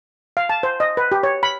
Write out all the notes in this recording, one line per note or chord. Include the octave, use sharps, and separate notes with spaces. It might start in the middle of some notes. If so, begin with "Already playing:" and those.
F5
A5
C5
D#5
B4
G4
C#5
B5